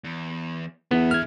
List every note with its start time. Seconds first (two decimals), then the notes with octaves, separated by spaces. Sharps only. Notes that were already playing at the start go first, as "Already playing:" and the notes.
0.04 E2
0.91 E2 D3 B3 E5
1.11 F6 G#6